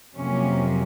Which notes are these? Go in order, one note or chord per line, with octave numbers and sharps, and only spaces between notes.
F2 C3 F#3 A#3 C#4